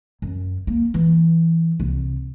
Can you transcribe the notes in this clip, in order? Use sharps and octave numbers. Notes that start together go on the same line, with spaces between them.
F#2
A#3
E3
C2